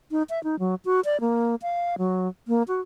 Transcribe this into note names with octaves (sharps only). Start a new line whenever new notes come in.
D#4
E5
D#4
F#3
F#4
D5
A#3
F5
F#3
A#3
F#4